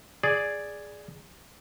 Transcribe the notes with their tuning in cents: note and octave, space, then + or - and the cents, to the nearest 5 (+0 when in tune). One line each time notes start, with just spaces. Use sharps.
G#4 +0 D5 +0